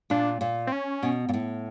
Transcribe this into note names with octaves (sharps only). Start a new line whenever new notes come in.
A#2 D4
A#2
C4
C#4
B2
A#2
A2